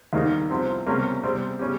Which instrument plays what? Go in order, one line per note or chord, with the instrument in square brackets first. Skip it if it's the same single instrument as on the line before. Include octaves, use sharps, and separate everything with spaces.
[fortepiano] D#2 D#3 G3 A#3 D#4
C2 C3 F3 C4
C#2 C3 G3 A#3 C#4
C3 G3 C4
C#3 G3 C#4 G4